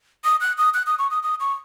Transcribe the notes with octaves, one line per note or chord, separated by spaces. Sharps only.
D#6
F#6
D#6
F#6
D#6
C#6
D#6
D#6
C#6